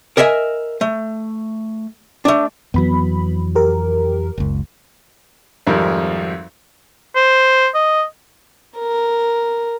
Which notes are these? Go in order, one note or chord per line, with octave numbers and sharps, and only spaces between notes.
A#4 D#5 E5 F#5 G#5
A3
A3 D4
F2 E3 F#3 B3 B5
G4 A#4
F#1 C#2
G#1 F2 G3 A#4
C5
D#5
A#4